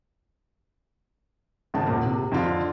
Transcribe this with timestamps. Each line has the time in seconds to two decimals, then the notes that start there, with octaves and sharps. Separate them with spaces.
1.74 G#1 C#3 A5
1.86 E1 A#2
2.03 C3
2.32 F2 D3 F4